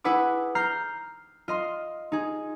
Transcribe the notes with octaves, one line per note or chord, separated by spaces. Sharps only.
E4 G#4 B4 F#5 D6
A#5 F6 G6 C7
F4 D#5 C6
D#4 G#4